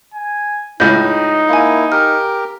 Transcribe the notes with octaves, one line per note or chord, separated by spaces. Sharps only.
G#5
C#2 A2 D#4 G6
A#3 E4 F5 G#5
G4 A#4 F6